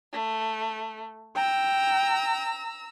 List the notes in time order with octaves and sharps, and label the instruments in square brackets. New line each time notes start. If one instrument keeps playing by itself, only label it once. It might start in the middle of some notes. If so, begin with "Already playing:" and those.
[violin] A3
[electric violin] G5 [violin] A#5 E6